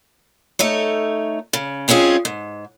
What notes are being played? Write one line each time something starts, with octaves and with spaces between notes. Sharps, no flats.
A3 D#4 C#5
C#3
G#3 C4 C#4 F4 G#4
G#2